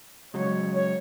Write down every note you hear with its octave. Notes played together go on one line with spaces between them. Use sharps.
C#3 F#3 G#3 C#5
C#5